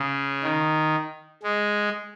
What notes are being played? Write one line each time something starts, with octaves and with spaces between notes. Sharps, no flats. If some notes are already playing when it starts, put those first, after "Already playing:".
Already playing: C#3
D#3
G#3